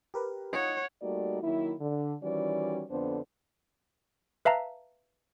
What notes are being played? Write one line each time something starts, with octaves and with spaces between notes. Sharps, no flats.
G4 A#4 B4
D#4 F4 C#5 D#5 F#5
G3 A3 A#3 D#4 F#4 D5
D#3 F#3 A#3 E4
D3
D#3 E3 G3 C#4 F#4 D5
F2 D3 B3 D4 C5
B4 E5 F5 A5 A#5